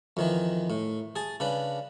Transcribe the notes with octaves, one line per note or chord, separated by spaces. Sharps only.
F2 D#3 E3
A2
G#4 A5
C#3 D4 B4